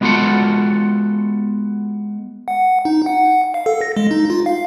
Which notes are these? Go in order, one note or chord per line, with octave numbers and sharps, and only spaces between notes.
G#3 B3 F4 F#4 A4 F#5
F#5
D#4
F#5
F5
A4
A#6
G#3
D#4
F4
F5